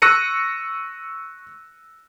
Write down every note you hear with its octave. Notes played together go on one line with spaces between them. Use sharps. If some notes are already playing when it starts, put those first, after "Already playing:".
C#6 E6 F#6 A#6 C#7 D#7